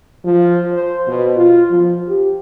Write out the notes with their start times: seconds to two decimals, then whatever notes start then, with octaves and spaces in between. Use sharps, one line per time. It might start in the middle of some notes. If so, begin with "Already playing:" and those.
0.24 F3
0.73 C5
1.08 B2
1.37 F4
1.70 F3
2.07 G4